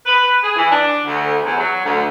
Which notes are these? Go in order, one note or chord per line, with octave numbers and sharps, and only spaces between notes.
B4
G#4
E3
D4
D2
E2
F#3
D2